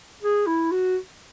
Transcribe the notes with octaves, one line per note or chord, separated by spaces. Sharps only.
G#4
E4
F#4